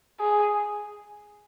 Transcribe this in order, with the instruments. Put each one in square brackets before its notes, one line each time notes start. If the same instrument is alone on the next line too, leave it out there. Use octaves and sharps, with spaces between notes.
[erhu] G#4